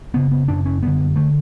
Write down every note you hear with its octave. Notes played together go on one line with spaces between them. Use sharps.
F#2 C#3 B3
B3
F#2 C#3 D4
C#4
F#2 D3 B3
D3 A3